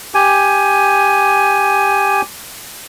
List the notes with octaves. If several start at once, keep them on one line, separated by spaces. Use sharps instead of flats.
G4 G#5